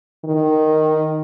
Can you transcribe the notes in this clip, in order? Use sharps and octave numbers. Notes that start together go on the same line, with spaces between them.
D#3